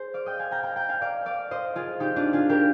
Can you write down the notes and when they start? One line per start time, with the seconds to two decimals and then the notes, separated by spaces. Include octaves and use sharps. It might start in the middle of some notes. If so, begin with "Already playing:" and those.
Already playing: G#4 C5
0.14 D5 F5
0.26 D#5 G5
0.39 F5 G#5
0.51 G5 A#5
0.63 G5 A#5
0.76 G5 A#5
0.89 F5 G#5
1.01 D5 F5
1.26 D5 F5
1.51 C5 D#5
1.76 F4 G#4
2.00 D#4 G4
2.16 D4 F4
2.33 F4 G#4
2.49 G4 A#4